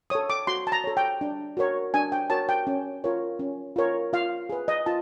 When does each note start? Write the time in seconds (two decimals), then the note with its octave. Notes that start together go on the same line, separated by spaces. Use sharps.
0.10 A4 C#5 D#6
0.30 D6
0.47 F#4 C6
0.67 A5
0.72 A#5
0.84 A4 C#5
0.97 G5
1.21 D4
1.57 F#4 A#4 C#5
1.94 D4 G#5
2.12 G5
2.30 F#4 A#4 C#5 A5
2.49 G5
2.67 C#4
3.04 F4 A#4 C#5
3.39 C#4
3.76 F4 A#4 C#5
4.13 F4 F5
4.50 G#4 B4
4.68 D#5
4.86 F4 A5